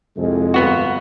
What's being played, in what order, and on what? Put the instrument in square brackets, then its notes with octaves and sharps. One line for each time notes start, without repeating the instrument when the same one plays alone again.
[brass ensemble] C2 F2 G#3
[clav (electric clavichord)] G1 B3 F#4